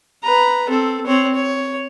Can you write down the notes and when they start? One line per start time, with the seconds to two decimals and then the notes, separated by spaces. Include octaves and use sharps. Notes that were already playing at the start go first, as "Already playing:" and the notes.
0.23 B4 A#5
0.69 C4 A4
1.06 C4 C#5
1.35 C#5